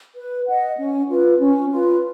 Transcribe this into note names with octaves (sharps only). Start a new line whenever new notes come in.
B4
D#5 F#5
C#4
F4 B4
C#4
F4 B4